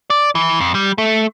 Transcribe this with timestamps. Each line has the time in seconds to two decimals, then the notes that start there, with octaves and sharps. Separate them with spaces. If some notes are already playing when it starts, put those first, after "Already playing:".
0.10 D5
0.35 E3
0.60 F2
0.75 G3
0.98 A3